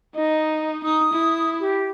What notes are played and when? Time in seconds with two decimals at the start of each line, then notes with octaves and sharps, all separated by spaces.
0.15 D#4 D#5
0.84 D#4 D#6
1.13 E4
1.60 G4